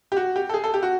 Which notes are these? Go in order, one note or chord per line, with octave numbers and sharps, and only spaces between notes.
G4
F#4
G4
A4
G#4
A4
G4
F#4